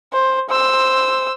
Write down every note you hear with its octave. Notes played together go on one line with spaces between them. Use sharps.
C5
C5 E6